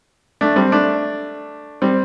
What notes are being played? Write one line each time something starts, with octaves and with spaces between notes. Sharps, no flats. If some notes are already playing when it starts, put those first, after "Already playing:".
A3 D4
G3 C4
A3 D4
G3 C4